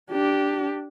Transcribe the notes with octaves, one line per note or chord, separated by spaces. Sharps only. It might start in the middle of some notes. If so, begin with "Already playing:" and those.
D4 G4